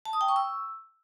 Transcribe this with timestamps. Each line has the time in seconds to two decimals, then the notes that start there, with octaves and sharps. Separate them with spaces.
0.05 A5
0.13 D#6
0.21 G5
0.28 C#6
0.36 E6